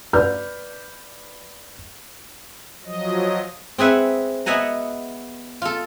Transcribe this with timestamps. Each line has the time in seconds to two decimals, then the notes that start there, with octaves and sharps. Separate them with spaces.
0.13 B4 D5 F6 G6
2.85 F3 F#3 D#5
3.78 C4 G#4 B4 E5 F#5
4.46 B3 D#5 E5 F#5 G#5 A#5
5.62 F4 A4